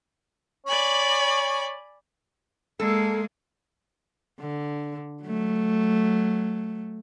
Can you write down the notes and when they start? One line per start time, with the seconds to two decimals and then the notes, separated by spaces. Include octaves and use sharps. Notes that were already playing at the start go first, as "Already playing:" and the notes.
0.66 C#5 D5 G#5 B5
2.80 G#3 A#3 A4
4.40 D3
5.23 F#3 A3